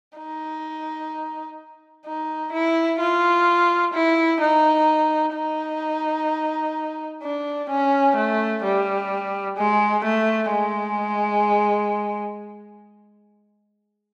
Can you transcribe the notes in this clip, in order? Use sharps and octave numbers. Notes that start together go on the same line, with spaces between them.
D#4
D#4
E4
F4
E4
D#4
D#4
D4
C#4
A3
G3
G#3
A3
G#3